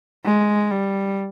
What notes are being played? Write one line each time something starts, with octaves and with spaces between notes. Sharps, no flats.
G#3
G3